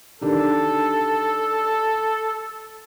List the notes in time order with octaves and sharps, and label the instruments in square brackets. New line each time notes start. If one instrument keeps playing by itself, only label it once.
[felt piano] D#3 D4 G4 [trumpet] A4